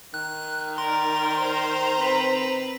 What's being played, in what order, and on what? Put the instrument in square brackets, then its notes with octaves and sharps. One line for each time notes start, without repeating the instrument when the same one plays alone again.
[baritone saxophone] D#3 [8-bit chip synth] F#6
[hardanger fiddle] A#4 D5 [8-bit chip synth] C6
[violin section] C5 A#5
[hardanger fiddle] C4 B4